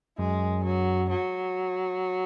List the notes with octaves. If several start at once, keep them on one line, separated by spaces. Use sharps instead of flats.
F#2 G#3
F#3
F#3